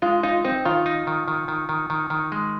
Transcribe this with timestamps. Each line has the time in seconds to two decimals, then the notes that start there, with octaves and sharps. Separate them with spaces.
0.02 G#3 F4
0.23 D#4 F4
0.44 C4 D#4
0.65 D#3 F4
0.86 D#4
1.07 D#3
1.28 D#3
1.48 D#3
1.69 D#3
1.90 D#3
2.10 D#3
2.32 G#3